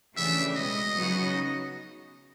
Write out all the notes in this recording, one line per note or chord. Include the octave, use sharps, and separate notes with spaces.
C#3 E3 A3 D4 G4 E5
B2 G#3 B3 D#5
C#3 F#3 B3 D#4 F#4